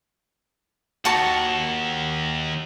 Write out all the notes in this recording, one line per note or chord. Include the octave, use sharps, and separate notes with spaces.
D#2 D#3 F#4 A5 C#6